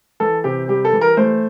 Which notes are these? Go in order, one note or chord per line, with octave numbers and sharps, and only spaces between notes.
E3 A4
C3 G4
G3 G4
A4
E3
A#4
A3 C5